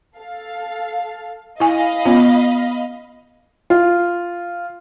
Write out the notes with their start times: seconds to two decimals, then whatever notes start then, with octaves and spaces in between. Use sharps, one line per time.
0.18 A4 F5
1.60 E4 D#5 F5 G#5 B5
2.05 B3 C#4 F4
3.70 F4